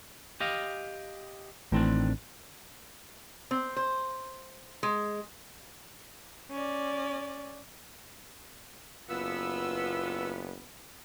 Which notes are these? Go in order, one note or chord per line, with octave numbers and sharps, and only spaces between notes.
G4 D#5 F5
A1 A2 D#3 C4 D4
C4
C5
G#3
C#4 D5
F#1 B3 F4 E6